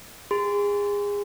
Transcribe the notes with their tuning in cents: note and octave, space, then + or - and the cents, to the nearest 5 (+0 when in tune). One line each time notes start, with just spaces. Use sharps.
G#4 -30 C6 -30